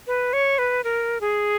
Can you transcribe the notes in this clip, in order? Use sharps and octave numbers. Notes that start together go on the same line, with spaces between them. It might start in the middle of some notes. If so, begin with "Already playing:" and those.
B4
C#5
B4
A#4
G#4